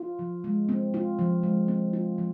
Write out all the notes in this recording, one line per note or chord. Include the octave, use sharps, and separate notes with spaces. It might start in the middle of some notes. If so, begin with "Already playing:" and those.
Already playing: F4
F3
G#3
C4
F4
F3
G#3
C4
F4
F3